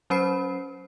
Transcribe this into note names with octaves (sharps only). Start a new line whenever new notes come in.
F#3 C#4 C5 B5 C7